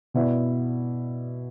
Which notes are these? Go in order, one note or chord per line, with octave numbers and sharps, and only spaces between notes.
B2 B3 E4 D5